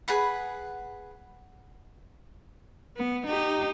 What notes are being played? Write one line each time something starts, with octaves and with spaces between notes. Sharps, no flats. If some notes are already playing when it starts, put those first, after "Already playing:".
G#4 B4 F#5 B5
B3
D#4 G4